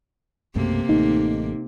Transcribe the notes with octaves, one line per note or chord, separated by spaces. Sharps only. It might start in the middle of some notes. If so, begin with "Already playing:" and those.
B1 F#2 C3 A3 A#3
A1 A3 D#4